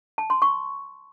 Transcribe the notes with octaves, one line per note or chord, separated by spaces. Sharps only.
A5
C6
C#6